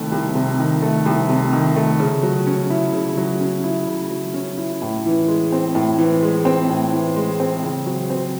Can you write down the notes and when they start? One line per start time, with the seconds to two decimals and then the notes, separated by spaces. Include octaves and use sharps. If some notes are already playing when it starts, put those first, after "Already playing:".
Already playing: C2 C3 D#3 A3
0.12 C2
0.35 C3
0.59 D#3
0.82 A3
1.06 C2
1.29 C3
1.53 D#3
1.76 A3
2.00 C#3
2.23 F#3
2.47 C#4
2.70 E4
2.93 C#3
3.17 F#3
3.40 C#4
3.64 E4
3.87 C#3
4.11 F#3
4.34 C#4
4.58 E4
4.82 A2
5.05 E3
5.28 G#3
5.52 C4
5.75 A2
5.98 E3
6.23 G#3
6.45 C4
6.69 A2
6.93 E3
7.16 G#3
7.40 C4
7.63 C#3
7.86 F#3
8.10 C4